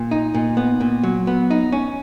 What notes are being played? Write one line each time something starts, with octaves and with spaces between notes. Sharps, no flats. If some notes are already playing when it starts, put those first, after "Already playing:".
Already playing: A#2
D#4
A#2
B3
A#2
F#3
B3
D#4
C#4